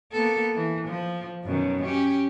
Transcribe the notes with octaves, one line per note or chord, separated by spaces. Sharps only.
A#3 B3 A4
E3
F3
F#2 B2 D#3
C#4 G4